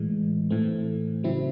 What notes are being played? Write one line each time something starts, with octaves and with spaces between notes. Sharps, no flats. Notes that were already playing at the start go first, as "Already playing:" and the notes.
Already playing: A2 E3 G#3
A2 E3 A3 C4
C#3 F#3 C4 E4